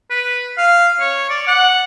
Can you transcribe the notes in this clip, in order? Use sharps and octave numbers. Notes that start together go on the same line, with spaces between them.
B4
F5
C#5
D5
F#5